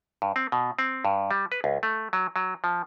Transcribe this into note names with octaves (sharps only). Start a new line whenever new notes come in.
G2
C4
B2
C4
G2
G3
B4
C#2
A3
F#3
F#3
F3